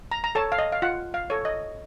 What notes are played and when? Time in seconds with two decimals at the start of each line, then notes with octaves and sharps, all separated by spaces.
0.11 A#5
0.24 A#5
0.35 A4 C#5 A5
0.52 F5
0.59 D#5
0.72 F5
0.82 F4 F#5
1.14 F5
1.30 A4 C#5
1.45 D#5